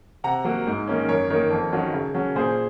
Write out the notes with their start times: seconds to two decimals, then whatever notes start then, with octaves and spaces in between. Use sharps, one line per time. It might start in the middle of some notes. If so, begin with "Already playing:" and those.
0.24 C3 F#5 A#5
0.44 F#3 A#3
0.67 G#2
0.87 D#3 A#3 C#4
1.08 F#2 A#4 C#5
1.30 D#3 A#3 A#4 C#5
1.50 F2
1.71 D#3 F#3 C#4
1.93 C#3
2.14 F#3 C#4
2.35 A#2 G#4 C5